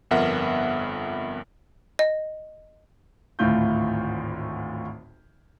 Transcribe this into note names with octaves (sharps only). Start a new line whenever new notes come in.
G1 F2 B3 A#4 E5 F#5
D#5
G#1 D2 A2 F4 G6